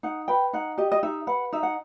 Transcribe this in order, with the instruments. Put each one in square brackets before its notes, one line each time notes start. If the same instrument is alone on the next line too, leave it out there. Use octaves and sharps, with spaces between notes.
[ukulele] D#4 F#5
B4 G5
D#4 F#5
G4 D#5
D#5
D#4 E5
B4 F#5
D#4 E5
F#5